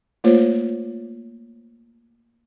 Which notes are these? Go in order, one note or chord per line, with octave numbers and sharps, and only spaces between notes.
A3 A#3 F4 C5 C#5